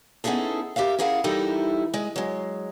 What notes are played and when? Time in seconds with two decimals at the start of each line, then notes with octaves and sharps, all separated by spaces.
0.24 B3 C#4 D#4 E4 G#4 A4
0.76 G4 A#4 E5 F5
0.99 C#4 E4 G#4 A#4 F5 F#5
1.24 E3 G3 D#4 E4 A4 A#4
1.94 G#3 D#5
2.16 F#3 G#3